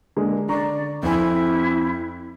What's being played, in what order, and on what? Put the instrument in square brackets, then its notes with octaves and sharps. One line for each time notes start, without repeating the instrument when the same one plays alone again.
[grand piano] D3 G#3 A#3
[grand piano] D3 A#5 C#6 [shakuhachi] D5
[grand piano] F2 C4 G#5 [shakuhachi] E4